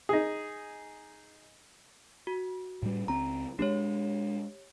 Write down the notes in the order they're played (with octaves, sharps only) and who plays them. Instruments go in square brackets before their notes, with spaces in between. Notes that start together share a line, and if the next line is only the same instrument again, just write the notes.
[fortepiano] D#4 G#4
[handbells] F#4
[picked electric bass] A2 G3
[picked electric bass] C#2 C4 [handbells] A#5
[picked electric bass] G#3 B3 D4 [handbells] G4 C#5